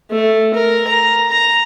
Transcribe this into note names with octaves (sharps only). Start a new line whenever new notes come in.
A3
A#4
A#5
A#5